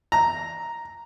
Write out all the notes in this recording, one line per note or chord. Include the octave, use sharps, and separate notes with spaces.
A#5